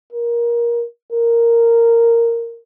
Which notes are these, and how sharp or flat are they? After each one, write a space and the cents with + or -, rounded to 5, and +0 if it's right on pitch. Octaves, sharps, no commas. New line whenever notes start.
A#4 +20
A#4 -5